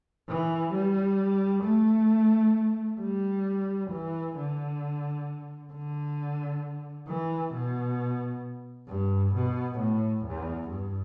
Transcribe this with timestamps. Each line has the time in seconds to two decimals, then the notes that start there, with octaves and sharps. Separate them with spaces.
0.29 E3
0.74 G3
1.64 A3
3.01 G3
3.91 E3
4.36 D3
5.73 D3
7.08 E3
7.54 B2
8.89 G2
9.35 B2
9.79 A2
10.25 E2
10.70 G2